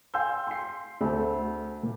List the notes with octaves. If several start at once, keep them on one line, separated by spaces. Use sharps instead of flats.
F5 G5 G#5 C6 E6 G6
C6 C7
D2 A3 C5 A5
A#2